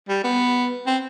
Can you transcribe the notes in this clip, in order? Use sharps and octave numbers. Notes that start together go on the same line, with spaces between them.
G3
B3
C4